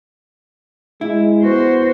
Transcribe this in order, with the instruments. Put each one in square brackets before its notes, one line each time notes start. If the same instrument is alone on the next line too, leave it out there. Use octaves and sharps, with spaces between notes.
[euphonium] G#3 [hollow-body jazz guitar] E4
[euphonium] B3 [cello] F#4 C5